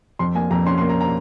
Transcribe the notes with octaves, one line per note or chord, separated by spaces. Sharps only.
F2 C6
A#3 G#5
F2 A#5
C#4 C6
C6
A#3
A#5
A#5